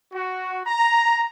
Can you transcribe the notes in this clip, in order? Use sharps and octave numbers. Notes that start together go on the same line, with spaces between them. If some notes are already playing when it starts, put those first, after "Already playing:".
F#4
A#5